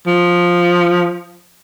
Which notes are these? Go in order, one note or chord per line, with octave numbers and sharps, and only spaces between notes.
F3